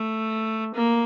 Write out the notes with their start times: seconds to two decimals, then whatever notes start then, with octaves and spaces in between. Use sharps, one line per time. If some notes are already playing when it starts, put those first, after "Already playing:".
Already playing: A3
0.74 A#3